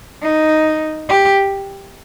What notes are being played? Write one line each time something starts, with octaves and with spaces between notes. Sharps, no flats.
D#4
G4